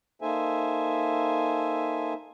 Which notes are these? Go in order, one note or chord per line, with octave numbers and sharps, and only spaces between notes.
A#3 D#4 A4 C5 E5 G#5